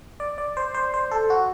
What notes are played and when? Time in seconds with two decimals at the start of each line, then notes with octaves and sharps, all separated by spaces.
0.20 D5
0.38 D5
0.57 C5
0.74 C5
0.94 C5
1.11 A4
1.30 F#4